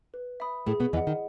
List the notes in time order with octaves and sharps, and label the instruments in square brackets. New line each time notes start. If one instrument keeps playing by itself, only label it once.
[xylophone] B4
E5 B5 D#6
[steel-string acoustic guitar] A2 A3 [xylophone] G#4
[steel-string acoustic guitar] B2 B3
[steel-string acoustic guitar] E2 E3 [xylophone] D#5
[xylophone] F#5
[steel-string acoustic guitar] D#3